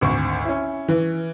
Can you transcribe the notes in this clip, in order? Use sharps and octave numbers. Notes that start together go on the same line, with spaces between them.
G#1 D2 C#6
C#4 E4
E3